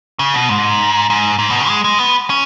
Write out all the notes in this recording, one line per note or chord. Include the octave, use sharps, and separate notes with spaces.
C#3
B2
G#2
G#2
G#2
B2
C#3
G#3
G#3
B3
C#4